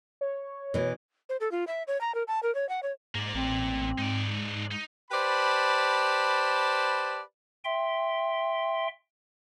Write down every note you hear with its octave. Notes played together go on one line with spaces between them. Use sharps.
C#5
B2 E3
C5
A4
F4
E5
C#5
A#5
A#4
A5
A#4
C#5
F#5
C#5
G#2 A#3 D5
A1 C4
G#2 D#4 D5
D#4
G4 B4 C5 D5 A5 B5
E5 G5 C6